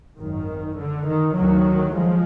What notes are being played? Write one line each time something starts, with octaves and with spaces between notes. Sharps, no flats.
G#1 F#2 D#3
D3
D#3
D2 D#3 F#3
F3 G#3